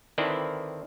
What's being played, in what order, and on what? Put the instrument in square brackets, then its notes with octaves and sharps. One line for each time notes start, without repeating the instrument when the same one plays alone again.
[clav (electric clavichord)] D3 D#3 C4 D4 E4 B4